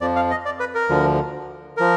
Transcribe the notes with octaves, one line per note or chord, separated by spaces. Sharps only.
F2 F3 D5
F5
D#5
D5
B4
A#4
D2 D3 F3
F3 A#4